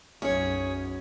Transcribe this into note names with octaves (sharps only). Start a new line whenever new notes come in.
B1 F#2 C#4 G#4 C#5